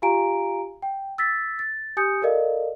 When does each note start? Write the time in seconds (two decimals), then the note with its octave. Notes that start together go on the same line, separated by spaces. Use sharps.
0.02 F4 G4 F5 G#5 A#5 D7
0.82 G5
1.18 E6 A6 B6
1.59 A6
1.97 G4 G#5 D#6 G6 C#7
2.22 A4 A#4 D5 D#5 F5